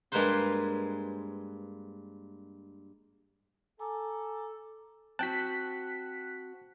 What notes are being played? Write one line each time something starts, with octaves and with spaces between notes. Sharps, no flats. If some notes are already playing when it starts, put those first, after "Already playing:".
G2 G#3 A#3 B4 C5 C6
A4 G#5 A#5 D6
C4 F#4 G5 A5 F#6 B6